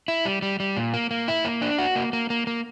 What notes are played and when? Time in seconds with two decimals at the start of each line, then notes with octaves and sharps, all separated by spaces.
0.08 E4
0.25 G3
0.42 G3
0.60 G3
0.77 A#2
0.94 A#3
1.11 A#3
1.28 E4
1.45 A#3
1.62 D4
1.78 F#4
1.96 A#3
2.13 A#3
2.30 A#3
2.47 A#3